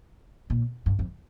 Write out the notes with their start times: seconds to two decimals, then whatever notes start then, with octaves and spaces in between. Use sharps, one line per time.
0.50 A#2
0.86 G2
0.99 F2